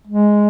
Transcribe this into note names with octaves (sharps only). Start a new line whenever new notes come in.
G#3